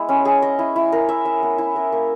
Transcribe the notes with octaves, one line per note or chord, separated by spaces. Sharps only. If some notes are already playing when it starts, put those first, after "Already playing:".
Already playing: G#3 B3 E4
C#4
G#4
D#5
E4
E4
A#4
E5
E5
B3
E4
A#4
A#3